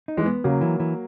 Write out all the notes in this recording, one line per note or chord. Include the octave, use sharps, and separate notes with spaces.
D#4
E3 G#3
B3
C#3 F#3 A#3
E3
E3